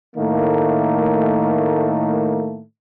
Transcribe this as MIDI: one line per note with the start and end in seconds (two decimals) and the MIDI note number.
0.16 2.63 45
0.16 2.63 51
0.16 2.63 57
0.16 2.63 58